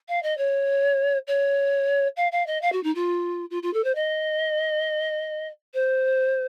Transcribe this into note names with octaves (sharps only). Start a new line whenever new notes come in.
F5
D#5
C#5
C#5
F5
F5
D#5
F5
F#4
D#4
F4
F4
F4
A4
C5
D#5
C5